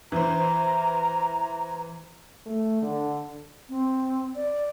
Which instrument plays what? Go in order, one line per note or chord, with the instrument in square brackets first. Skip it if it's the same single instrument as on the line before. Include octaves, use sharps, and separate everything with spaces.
[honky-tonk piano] E3 C5 [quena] A#5
[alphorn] A3
D3
[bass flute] C4
D5